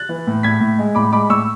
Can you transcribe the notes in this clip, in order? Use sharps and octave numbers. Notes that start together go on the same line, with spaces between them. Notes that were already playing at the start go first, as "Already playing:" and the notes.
Already playing: F#6 A6
E3
A2
A2 G#6 B6
A2
G#3
A2 B5 D6
G#3 B5 D6
A2 C#6 E6